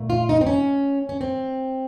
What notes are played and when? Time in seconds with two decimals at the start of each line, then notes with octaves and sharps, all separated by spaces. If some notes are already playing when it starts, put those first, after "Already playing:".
Already playing: A#2 A3
0.10 F4
0.29 D#4
0.41 C4
0.47 C#4
1.09 C#4
1.21 C4